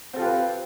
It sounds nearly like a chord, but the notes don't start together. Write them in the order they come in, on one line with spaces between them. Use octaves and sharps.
C4 A4 F4 G4 B4